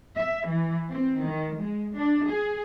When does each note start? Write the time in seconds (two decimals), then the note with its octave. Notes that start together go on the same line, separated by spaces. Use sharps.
0.16 E5
0.47 E3
0.91 C4
1.23 D#3
1.60 G#3
1.97 D4
2.29 G#4